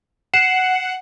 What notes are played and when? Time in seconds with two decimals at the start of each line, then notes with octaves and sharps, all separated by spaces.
0.34 F#5 C7 E7